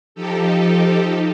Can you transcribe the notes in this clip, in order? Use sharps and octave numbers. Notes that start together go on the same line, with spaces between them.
F3 D#4 G4 A4